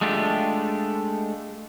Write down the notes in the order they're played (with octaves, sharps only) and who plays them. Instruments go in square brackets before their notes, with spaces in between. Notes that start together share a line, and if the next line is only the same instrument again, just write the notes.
[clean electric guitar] G#3 A3 D4 F4 G4